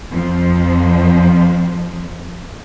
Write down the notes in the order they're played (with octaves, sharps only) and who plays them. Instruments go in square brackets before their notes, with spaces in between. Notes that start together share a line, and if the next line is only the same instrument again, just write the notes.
[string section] F2 F3